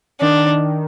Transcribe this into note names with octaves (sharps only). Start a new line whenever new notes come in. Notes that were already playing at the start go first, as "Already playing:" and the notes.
D#3 D4